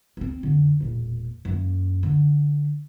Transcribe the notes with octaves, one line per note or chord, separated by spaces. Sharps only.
B3 C4
F2 D3
E1 A#2
F#2 A#3
D3